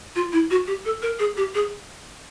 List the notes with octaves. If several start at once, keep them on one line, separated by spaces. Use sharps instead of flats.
F4
E4
F#4
G4
A4
A#4
G#4
G4
G#4